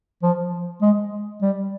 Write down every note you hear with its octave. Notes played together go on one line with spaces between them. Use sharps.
F3
G#3
G3